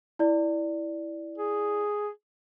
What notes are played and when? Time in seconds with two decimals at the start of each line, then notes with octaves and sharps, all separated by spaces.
0.19 E4 D5
1.38 G#4